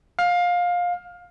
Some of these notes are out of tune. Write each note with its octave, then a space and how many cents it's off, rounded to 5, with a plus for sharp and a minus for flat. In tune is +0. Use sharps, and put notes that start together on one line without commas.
F5 +20